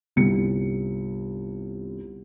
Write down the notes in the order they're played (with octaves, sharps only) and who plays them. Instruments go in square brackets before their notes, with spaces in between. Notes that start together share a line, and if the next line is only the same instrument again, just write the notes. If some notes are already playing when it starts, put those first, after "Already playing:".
[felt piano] G1 C2 C#7